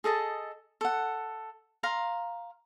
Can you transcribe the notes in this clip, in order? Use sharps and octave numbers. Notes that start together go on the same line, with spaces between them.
G#4 A4 D#5 A5
A4 F#5
F5 A#5 C6